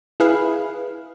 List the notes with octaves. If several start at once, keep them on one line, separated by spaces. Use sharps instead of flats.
E4 G#4 B4 F5